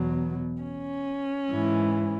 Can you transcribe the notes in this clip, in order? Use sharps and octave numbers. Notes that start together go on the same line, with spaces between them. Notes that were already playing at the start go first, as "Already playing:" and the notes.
Already playing: E2 B2 F#3
C#4
G#2 E3